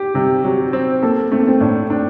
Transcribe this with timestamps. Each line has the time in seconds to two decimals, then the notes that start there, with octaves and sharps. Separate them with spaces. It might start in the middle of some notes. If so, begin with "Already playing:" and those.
Already playing: G4
0.14 C3 G3
0.44 F#3 G3
0.73 C4
1.03 A#3 A4
1.32 A3 C4
1.39 A#3
1.48 C4
1.60 A2 D4
1.90 C4 D4